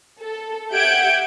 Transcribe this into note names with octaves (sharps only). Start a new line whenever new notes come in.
A4
G4 E5 F#5 G6 G#6 D7